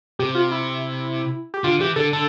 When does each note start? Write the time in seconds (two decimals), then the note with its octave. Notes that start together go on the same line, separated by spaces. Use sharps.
0.19 C3 G4
0.35 F4
0.51 E4
1.54 G4
1.64 D3 F4
1.80 E3 G4
1.96 D3 A4
2.13 D3 A4